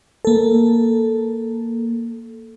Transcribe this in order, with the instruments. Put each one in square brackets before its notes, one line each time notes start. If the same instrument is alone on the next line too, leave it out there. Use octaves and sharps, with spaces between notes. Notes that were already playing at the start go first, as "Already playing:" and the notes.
[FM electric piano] A#3 A4